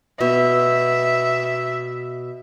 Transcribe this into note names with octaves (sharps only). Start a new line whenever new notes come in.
B2 E5